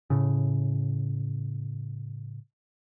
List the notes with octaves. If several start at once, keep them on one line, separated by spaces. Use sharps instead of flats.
A2 C#3